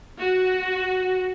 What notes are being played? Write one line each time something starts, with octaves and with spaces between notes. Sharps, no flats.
F#4